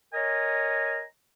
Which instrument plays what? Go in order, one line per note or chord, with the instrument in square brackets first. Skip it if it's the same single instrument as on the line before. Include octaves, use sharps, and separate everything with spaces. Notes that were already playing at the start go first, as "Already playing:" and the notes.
[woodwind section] A#4 C#5 D#5 G#5 A#5